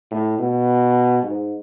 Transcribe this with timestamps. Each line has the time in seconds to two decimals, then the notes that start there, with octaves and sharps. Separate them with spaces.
0.11 A2
0.39 B2
1.23 G#2